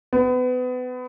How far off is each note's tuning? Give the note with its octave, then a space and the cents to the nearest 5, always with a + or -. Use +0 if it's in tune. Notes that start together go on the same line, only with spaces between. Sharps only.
B3 +30